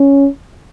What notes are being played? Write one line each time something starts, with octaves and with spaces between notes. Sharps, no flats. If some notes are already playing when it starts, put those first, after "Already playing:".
Already playing: C#4